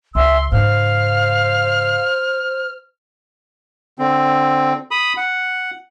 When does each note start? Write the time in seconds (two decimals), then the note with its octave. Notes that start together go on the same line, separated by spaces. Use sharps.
0.15 C#2 E5 G#5 C6 E6
0.52 G#2 C#3 C5 F5 F6
3.99 D3 C4
4.91 B5 D#6
5.17 F#5